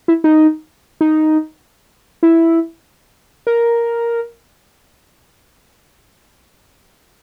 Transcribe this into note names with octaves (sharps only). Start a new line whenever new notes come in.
E4
D#4
D#4
E4
A#4